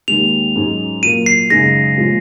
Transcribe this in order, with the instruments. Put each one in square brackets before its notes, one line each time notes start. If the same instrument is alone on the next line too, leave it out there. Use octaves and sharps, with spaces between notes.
[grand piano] D#2 D#3 G#3 [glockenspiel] F7
[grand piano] G#2 F#3 C#4 G#4
[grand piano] A#2 F#3 A#3 [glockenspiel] D#7
[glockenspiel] C7
[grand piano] F#2 C#3 G#3 D#4 G#4 [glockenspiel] A#6
[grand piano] A#2 F3 G#3